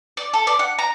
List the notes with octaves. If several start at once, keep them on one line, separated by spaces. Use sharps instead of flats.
D5
A4
D5
F#5
A#5